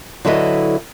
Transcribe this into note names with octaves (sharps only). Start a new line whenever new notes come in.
D3 F#3 E4 A4 B4 D#5